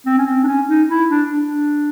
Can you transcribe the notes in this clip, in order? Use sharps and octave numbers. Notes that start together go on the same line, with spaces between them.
C4
C#4
C4
D4
C#4
D#4
E4
D4
D4